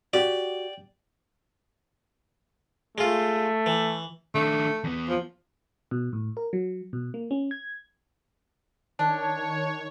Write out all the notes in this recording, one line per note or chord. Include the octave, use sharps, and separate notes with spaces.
F#4 G4 D5
G#3 A3 F4
E3
D#3 A3 D4
E2 B3
F3
B2
A2
A#4
F#3
B2
A#3
C#4
G#6
D#3 D4 C#5 A5